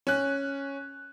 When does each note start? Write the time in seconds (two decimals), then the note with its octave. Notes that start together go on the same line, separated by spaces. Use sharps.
0.07 C#4 F#6